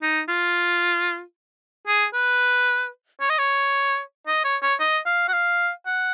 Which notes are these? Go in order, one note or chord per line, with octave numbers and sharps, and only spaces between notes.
D#4
F4
G#4
B4
C#5
D#5
C#5
D#5
C#5
C#5
D#5
F5
F#5
F5
F#5